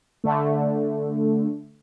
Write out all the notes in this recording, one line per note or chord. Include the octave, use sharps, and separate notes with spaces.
D3 A3